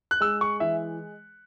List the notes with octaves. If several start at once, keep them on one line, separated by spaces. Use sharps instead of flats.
F#6
G#3 E6
C#6
E3 E5